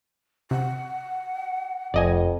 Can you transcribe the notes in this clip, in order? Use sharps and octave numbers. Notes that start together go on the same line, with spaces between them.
C3 F#5
F1 F2 D5 D#5 G#5